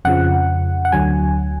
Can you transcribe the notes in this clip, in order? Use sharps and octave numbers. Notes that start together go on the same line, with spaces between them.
F2 C#3 F3 F#5
F#5
D2 D3 F#3 G#5